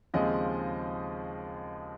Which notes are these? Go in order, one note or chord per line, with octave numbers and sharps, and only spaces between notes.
D#2 C#3 F3 G#3 C4 D#5